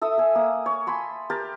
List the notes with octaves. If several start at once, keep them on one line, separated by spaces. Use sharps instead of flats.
A4 E5 D#6 E6
A4 G#5
A#3 D#6
C#5
G#5 A5 B5 C6
G4 A#4 A5